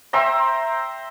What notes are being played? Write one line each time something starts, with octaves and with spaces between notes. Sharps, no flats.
C5 E5 G5 A#5